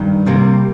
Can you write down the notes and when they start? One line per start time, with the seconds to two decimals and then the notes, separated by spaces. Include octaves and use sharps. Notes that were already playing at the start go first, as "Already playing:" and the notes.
Already playing: G2 D#3
0.26 C3 G3 A#3